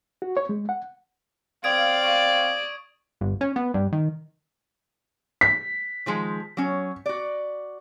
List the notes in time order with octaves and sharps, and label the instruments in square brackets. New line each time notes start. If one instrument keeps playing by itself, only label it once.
[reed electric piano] F#4
C#5
G#3
F#5
[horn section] C4 F5 [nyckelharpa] D5 [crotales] D#6 G#6 D7
[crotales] C#6
[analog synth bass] G1
C#4
B3
G2
D#3
[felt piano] B6
[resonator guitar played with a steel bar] D#3 F3 G#3
F#3 C#4
F#4 D5